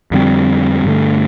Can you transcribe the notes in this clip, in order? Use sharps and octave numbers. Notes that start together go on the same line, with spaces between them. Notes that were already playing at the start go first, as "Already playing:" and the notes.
F2 D3 G3 C4
G2 D3 A3